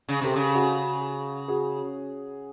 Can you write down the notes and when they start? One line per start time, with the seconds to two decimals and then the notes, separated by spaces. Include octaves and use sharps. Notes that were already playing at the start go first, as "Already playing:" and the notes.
0.09 C#3
0.22 C3 G4 A4
0.36 C#3
0.55 F#4 G#4
1.48 F#4 G#4